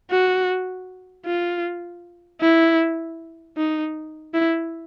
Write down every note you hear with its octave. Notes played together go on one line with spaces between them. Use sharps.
F#4
F4
E4
D#4
E4